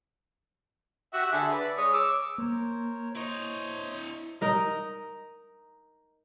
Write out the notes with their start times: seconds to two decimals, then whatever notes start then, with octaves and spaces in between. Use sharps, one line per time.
1.14 F#4 G4 E5
1.33 D3 G#4 E5
1.52 B4 D5
1.78 G#3 C#5 D#6
1.94 C#5 D6 E6
2.38 A#3 A#4 C5 C#5
3.15 E4 C5 C#5 D#5
4.41 D#4 A#4 D#5